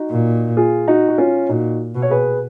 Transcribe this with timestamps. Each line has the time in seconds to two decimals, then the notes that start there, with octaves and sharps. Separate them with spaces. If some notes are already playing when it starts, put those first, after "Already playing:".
Already playing: D#4 F#4
0.10 A#2
0.57 F4 G#4
0.88 D#4 F#4
1.08 F#4
1.18 C#4 F4
1.49 A#2 D#4 F#4
1.95 B2
2.02 C#5
2.10 G#4 B4